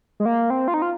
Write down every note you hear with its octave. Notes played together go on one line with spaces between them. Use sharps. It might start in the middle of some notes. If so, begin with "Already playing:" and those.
G#3
A#3
C4
F4
D#4
F4